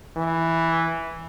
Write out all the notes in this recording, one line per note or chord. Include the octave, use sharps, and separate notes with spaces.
E3